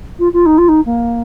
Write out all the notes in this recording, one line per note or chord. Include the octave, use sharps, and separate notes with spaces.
F4
F4
D#4
F4
D#4
A#3